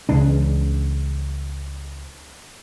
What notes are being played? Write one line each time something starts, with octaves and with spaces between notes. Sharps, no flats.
C#2 C#3 E3 D4